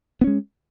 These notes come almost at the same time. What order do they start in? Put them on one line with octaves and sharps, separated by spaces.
B3 C#4 G#3